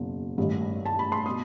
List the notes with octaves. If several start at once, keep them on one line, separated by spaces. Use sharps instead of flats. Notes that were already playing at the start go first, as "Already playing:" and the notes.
Already playing: F#1 E2 B2
A1 G2 D#3
A5
B5
C6
B2 D#6